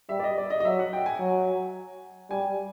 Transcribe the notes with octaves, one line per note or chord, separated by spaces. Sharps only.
G3 E5
D5
D#5
D5
D#5
D#5
F#3 E5
F#5
G5
G#5
F#3
G3 G#5